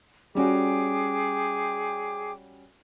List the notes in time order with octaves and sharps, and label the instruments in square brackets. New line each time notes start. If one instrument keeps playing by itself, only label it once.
[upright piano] G3 C#4 F#4 [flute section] G#4 G5 D6